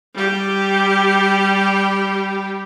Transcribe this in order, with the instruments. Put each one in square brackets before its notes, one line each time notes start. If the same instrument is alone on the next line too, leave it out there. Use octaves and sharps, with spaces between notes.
[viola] G3 G4